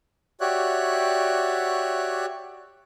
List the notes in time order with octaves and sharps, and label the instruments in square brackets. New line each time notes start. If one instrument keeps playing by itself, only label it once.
[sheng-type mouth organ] F#4 G4 C#5 D5 E5 F#6